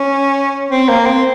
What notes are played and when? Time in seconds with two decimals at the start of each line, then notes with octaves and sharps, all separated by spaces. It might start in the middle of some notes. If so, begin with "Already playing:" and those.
Already playing: C#4
0.71 C4
0.89 A#3
1.06 C4